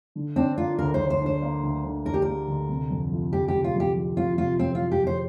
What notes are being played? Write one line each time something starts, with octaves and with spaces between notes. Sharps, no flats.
D3
C4 D4
A#3 F4
D2 A#4
C5
D3
C5
D4
C5
A#3
D2
D3
D4 A#4
G4
A#4
A#3
D2
C3
F2
F3
F2 G4
G4
C3
F4
F2
G4
F3
F2 F4
C3 F4
F2 C4
F4
F3
G4
F2 C5